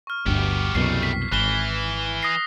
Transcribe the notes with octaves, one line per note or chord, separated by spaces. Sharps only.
C#6 F6
G1 D2 G2 B3 G4
C2 F#2 B2 G3 A3 C7
B6
G#1 E3 F#6 G7
D#6 A#6 C7